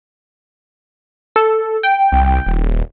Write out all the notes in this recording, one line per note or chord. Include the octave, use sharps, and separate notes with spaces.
A4
G5
C2
D#1